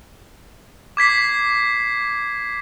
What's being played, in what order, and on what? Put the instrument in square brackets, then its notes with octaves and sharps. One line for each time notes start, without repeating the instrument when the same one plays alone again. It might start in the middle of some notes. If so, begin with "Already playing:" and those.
[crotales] D6 G#6 B6 C7